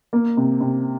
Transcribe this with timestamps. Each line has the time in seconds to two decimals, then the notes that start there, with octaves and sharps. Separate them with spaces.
0.13 A#3
0.37 C3
0.61 C3